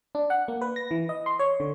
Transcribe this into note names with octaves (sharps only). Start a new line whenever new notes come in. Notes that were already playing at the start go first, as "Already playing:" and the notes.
D4
F#5
A#3
B4
A#6
E3
D#5
C6
C#5
D3